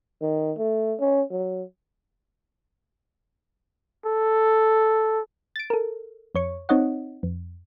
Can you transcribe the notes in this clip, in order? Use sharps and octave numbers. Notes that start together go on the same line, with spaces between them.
D#3
A3
C#4
F#3
A4
A6 D7
A4 A#4
F2 C#5 C#6
C4 D#4 C#5 D#5 F#5
F2